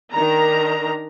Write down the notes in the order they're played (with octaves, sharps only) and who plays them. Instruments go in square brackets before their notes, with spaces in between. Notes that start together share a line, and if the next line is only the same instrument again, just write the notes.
[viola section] D#3 D4 A#5